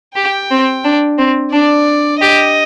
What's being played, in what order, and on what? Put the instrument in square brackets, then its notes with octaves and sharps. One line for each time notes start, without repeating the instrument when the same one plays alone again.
[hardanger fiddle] G4 [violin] G5
[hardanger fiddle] C4
D4
C4
[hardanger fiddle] D4 [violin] D5
[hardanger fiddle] G4 [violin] D#5